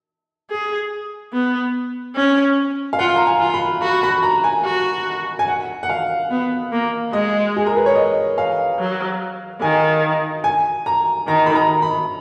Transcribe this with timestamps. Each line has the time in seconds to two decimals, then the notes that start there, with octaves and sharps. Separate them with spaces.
0.50 G#4
1.33 B3
2.16 C#4
2.93 F5
2.99 F4 F#5
3.16 A#5
3.27 G#5
3.40 F4
3.54 B5
3.82 F#4 B5
4.03 B5
4.23 A#5
4.44 G#5
4.64 F#4
5.39 G#5
5.48 F#5
5.83 F#5
5.89 F5
6.30 B3
6.72 A#3
7.13 G#3 D#5
7.56 G#4
7.66 A#4
7.76 B4
7.86 C#5
7.95 D#5
8.38 F5
8.79 F#3
9.62 D#3 G#5
10.44 G#5
10.86 A#5
11.27 D#3 A#5
11.46 B5
11.55 A#5
11.82 B5